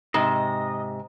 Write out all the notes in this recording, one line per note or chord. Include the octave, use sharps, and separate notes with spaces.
G#2 C3 D#5